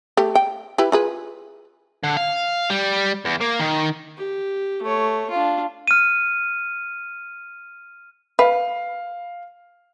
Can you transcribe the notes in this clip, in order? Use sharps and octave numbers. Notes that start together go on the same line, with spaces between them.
A3 G4
G5
E4 G4 B4
F4 G#4 B4
D3
F5
G3
E2
A#3
D#3
G4
A3 C#5
D4 F4
F6 D#7
B4 F5